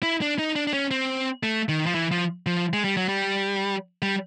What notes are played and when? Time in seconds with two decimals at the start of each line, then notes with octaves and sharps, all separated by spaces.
0.03 E4
0.22 D4
0.39 D#4
0.56 D4
0.67 D4
0.74 C#4
0.91 C4
1.43 A3
1.69 D#3
1.86 F3
1.95 E3
2.11 F3
2.46 F3
2.73 G#3
2.84 G3
2.97 F#3
3.08 G3
4.02 G3